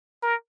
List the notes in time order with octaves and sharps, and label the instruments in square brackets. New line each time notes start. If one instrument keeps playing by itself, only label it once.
[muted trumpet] A#4